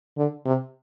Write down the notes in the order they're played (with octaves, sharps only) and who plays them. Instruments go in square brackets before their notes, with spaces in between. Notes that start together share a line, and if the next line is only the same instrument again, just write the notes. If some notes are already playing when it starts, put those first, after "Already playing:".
[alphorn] D3
C3